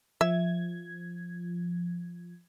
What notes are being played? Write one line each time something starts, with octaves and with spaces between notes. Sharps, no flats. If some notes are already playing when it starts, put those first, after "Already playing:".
F3 E5 G#6